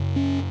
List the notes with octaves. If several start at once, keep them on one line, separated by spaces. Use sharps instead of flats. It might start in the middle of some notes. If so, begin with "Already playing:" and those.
Already playing: F#2 C#3
C#4